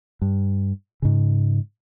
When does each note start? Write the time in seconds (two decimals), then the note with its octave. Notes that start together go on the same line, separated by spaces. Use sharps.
0.22 G2
1.02 G#2 C#3